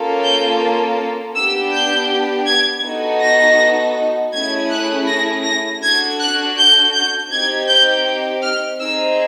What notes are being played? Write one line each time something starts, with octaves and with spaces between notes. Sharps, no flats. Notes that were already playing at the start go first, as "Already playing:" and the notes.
Already playing: A#3 C#4 F4 A4
G6
B3 D4 G4 E6
G6
G#6
B3 D#4 F#4 A4
A#6
A3 C#4 E4 G#4 G#6
F#6
A#6
A#6
D4 F#4 A4 G#6
F#6
G6
G6
C4 D#4 G4 G#6
G6
F6
C4 D#4 G#4 E6